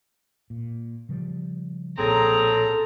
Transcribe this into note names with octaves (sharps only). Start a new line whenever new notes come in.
A#2
C#3 F3 G3
B1 A#2 F3 C4 C#4 G#4 A4 A#5